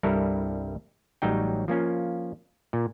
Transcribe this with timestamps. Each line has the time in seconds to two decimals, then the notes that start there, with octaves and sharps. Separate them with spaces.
0.03 C2 G2 G3 E4 A4 A#4
1.22 A1 F#3 G3 D#4 C#5 G5
1.68 F3 A#3 C#4 F4
2.73 A#2